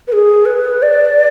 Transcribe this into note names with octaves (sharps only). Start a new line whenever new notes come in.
B4
G#4
B4
D5